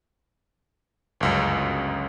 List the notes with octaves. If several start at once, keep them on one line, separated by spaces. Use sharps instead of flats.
G1 C#2 F#2